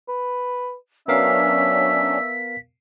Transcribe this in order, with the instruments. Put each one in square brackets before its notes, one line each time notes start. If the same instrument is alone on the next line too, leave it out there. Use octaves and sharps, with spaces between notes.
[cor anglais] B4
[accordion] F#3 C#4 D4 [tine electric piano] B3 A#4 F5 [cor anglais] E5 [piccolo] B6